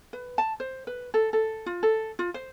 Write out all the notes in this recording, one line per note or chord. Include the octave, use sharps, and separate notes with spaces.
B4
A5
C5
B4
A4
A4
F4
A4
F4
C5